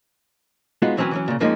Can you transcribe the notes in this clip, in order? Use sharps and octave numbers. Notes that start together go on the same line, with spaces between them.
G#3 B3 D#4 F4 F#4
E3 F#3 C4 C#4 B4
E3 F#3 C#4
A#2 C#3
F2 F3 G#3 A#3 C#4 D#4